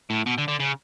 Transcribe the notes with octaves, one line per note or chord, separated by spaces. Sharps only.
A2
B2
D3
D3
C#3